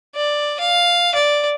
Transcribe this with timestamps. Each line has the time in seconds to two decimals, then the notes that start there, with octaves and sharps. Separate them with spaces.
0.15 D5
0.60 F5
1.15 D5